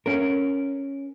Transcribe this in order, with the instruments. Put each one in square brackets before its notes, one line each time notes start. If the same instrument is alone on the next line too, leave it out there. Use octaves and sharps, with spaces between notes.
[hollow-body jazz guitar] C#4 A#4